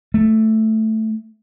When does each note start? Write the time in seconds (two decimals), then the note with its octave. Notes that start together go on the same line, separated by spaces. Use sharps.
0.14 A3